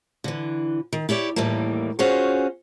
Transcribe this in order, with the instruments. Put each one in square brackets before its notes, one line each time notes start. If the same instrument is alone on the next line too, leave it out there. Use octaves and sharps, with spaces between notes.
[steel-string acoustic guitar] D3 E3
D#3
E4 G4 C#5 D5
D#2 A2 E3 G3 A#3
C#4 F4 F#4 G#4 C5 C#5